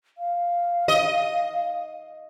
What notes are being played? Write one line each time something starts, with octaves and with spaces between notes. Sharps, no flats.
F5
D#5